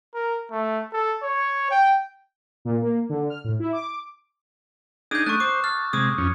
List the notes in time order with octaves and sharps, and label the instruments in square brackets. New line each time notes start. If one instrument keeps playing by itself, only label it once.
[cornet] A#4
A3
A4
C#5
G5
[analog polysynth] A#2
A#3
D3
F6
A2
E4
D6
[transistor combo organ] D4 D#4 G#4 [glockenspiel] D#6 G6
[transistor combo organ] A3 D4 D#6 [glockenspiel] C#6 F#6
[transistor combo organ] C5 [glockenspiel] D6
[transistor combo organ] A5 [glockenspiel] F6
[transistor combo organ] C3 G#3 [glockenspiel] D6 D#6
[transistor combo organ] F2 C#4